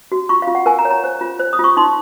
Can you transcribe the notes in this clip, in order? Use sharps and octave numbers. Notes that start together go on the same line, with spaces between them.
F#4
F4 C#6
F5
F4
F#5
A#4 G#5
A#5
C#5
A#5
C5
F4
C5
D#6
F4 C#6
D#4 C6